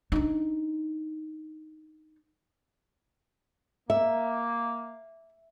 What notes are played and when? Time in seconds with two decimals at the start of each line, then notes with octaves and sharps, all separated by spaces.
0.12 D4 D#4
3.90 A#3 E5